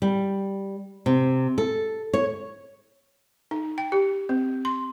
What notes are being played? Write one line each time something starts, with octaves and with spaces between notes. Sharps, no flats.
G3
C3
A4
C#5
D#4
G5
G4
C4
C6